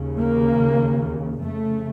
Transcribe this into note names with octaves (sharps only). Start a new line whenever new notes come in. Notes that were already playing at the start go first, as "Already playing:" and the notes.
Already playing: D#2 C#3
A#3
F2 C#3 A3